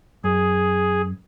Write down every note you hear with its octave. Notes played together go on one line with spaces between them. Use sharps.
F#2 G#4